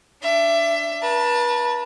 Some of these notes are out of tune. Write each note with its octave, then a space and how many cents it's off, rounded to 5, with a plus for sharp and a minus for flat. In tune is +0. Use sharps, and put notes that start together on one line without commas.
D4 +0 E5 +25
B4 -35 A5 +15